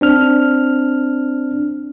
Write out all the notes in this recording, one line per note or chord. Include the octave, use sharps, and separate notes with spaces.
C4 D4 F6